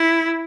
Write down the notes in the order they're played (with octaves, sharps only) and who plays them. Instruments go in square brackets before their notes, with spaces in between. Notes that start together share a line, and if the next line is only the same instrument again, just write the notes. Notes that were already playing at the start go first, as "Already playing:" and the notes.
Already playing: [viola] E4